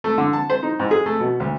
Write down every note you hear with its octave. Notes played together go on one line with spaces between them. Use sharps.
A3
D3
A5
C5
D#4
G#2
G#4
A3
B2
D2